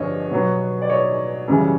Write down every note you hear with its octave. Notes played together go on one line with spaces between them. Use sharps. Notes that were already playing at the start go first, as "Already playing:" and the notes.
Already playing: G2 D3 F3 C#5 D#5
B2 F#3 B3
D5
C#5 D#5
F#2 C#3 E3 G3